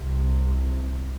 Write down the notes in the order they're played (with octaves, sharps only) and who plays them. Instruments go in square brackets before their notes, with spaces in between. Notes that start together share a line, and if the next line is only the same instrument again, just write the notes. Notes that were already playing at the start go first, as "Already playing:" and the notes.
Already playing: [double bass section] C2 C3